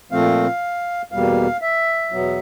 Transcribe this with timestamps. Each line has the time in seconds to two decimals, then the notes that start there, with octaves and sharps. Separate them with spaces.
0.12 A#2 F3 A3 C4 F5
1.12 E2 B2 G3 A#3 F5
1.62 E5
2.12 E2 B2 F#3 B3